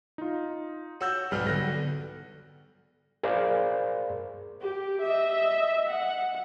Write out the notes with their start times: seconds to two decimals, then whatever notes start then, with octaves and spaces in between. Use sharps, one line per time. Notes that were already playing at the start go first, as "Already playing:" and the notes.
0.18 D#4 F4
1.01 F#4 C#5 A5 E6 G6
1.31 C2 F2 G#2 B2 G3 F6
1.47 B1 D3 F#6 A#6
3.23 G#4 A#4 C5 D5 F5
4.61 G4
5.02 D#5 E5
5.90 F#5